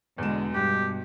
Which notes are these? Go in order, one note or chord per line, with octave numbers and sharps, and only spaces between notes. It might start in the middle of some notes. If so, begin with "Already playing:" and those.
E2 B2 D3 G#3 E7
G2 B2 G4 F#6